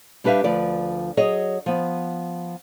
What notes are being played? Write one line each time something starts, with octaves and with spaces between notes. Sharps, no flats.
G3 D4 G4 B4 E5 F5
D2 F3 B4 D5
F#3 G#4 C#5 D#5
F3 B3